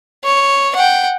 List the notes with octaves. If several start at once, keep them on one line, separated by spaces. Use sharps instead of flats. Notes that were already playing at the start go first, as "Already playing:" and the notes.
C#5
F#5 G5